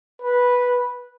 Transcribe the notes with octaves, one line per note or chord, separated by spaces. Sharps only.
B4